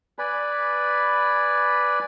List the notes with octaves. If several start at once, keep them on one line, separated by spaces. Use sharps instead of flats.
B4 D5 G#5 B5